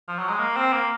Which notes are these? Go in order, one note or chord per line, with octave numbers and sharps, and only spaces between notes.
F3
F#3
G#3
A#3
C4
A#3